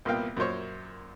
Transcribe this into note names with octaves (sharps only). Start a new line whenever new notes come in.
C2 A#2 A#3 B3 F5 G5
F#2 A#2 A#3 C5 C#5